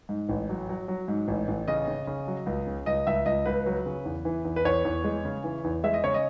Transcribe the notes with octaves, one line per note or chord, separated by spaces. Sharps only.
G#2
A1
F#3
F#3
F#3
G#2
A1
A1
C#3 D#5
C#3
C#3
F#3
C#2
C#3
C#2 D#5
C#2 E5
C#2 D#5
C#2 B4
F#3
C#3
E2
E3
E2
B4
E2 C#5
E2
G#3
C#3
E3
E2
G#3 E5
D#5
C#3 C#5
D#5